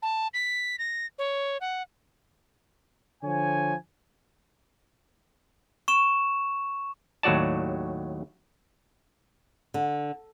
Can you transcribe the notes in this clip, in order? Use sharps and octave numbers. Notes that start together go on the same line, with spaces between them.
A5
B6
A#6
C#5
F#5
D3 F3 C#5 G#5
C#6 E7
D#2 A2 F#3 F#4 D5 A5
D3